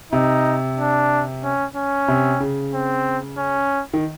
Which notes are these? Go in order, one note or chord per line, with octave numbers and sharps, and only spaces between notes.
C3 D#4
D4
C#4
C#4
C3
C#3
C4
C#4
D#3